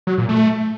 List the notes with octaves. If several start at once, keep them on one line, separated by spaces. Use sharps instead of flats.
F#3
A#2
A3